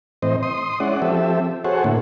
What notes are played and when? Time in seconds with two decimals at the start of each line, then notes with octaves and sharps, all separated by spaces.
0.22 A2 E3 C4 C5 D#5
0.43 C6 D#6
0.80 G#3 C#4 E4 D5 F#5
1.02 F3 C4 G4 A4 E5
1.64 F#4 G#4 A4 C5 C#5 F#5
1.84 A2 D3 A#3 E4